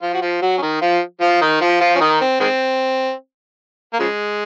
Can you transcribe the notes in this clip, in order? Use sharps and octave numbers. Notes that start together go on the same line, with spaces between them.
F3 F4
F#4
F3 F4
F#3 F#4
C#4
D#3 D#4
F3 F4
F3 F4
D#3 D#4
F3 F4
F3 F4
C#4
D#3 D#4
C4
D#3 G#3 C4
A#3
C#3 F3 G#3